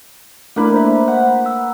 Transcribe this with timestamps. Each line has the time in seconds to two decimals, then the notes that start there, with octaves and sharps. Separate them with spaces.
0.56 A3 A#3 D4 E4 B4
0.74 C5 E5
1.08 F#5
1.46 E6